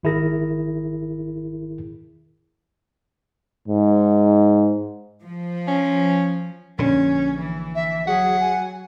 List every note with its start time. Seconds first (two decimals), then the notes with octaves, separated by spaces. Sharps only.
0.03 G#1 D#3 E4 G#4 A#4 A#6
3.68 G#2
5.24 F3
5.68 C#4
6.78 A#1 D3 C#4
7.39 E3
7.75 E5
8.07 F#3 G#4 F#5
8.41 G#5